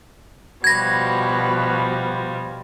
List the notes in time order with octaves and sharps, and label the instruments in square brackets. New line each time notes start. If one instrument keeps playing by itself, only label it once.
[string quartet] B2 F3 G3 [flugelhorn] F#4 [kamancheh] B4 [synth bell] G#6 A#6